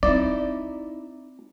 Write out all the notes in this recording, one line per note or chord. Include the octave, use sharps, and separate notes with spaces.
C4 D#4 E4 D5